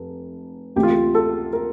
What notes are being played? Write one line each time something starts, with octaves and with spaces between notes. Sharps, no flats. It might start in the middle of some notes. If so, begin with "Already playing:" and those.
Already playing: F1
D2 C3 E3 A3 G4
F4
G4
A4
A#4